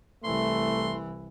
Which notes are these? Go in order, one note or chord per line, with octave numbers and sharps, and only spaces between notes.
C2 E3 A3 C6